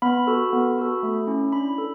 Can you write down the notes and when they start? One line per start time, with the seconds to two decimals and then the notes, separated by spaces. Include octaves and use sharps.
0.02 B3 B5
0.27 F#4 A4
0.53 B3
0.78 F#4 A4
1.03 A3
1.27 C#4 E4
1.52 D4 B5
1.78 A4